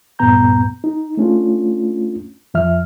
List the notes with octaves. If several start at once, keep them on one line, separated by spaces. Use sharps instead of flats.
D2 G2 A#2 B3 A#5 G6
D#4
A3 C#4 D4 F4
F2 F3 E5 F6